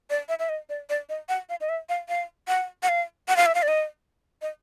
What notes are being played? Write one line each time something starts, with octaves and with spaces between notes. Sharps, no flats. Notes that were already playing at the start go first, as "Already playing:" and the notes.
D5
E5
E5
D#5
D5
D5
D#5
F#5
F5
D#5
E5
F5
F5
F#5
F#5
F5
F#5
F5
E5
F5
D5
D#5
D#5